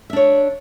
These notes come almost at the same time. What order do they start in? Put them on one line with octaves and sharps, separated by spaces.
E5 D4 C#5